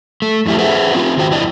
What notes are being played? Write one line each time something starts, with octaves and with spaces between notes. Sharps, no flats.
A3
F2 E3 E4 G4
G#4 B4 C5 E5 F#5
C4 F4 G4
E2 D#3 F#4 C5 G5
F2 E4 D5 D#5